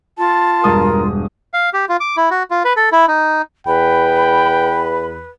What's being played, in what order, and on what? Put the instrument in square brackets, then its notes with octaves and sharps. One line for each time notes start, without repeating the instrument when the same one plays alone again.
[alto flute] F4 [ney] A5
[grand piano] E1 G2 D#6 [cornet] A#4
[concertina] F5
G4
F4
D6
E4
F#4
F4
B4
A4
E4
D#4
[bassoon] E2 [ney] B4 [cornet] G5 [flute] B5